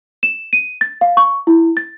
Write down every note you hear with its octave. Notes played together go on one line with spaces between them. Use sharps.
E7
D#7
A6
F5
C#6
E4
A6